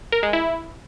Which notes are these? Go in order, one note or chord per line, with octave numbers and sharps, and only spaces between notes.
A#4
G#3
E4